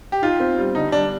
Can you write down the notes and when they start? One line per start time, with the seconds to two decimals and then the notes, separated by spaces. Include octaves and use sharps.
0.12 G4
0.22 D#4 F4
0.40 C4
0.57 G3
0.74 D3 D#4
0.92 G3 D4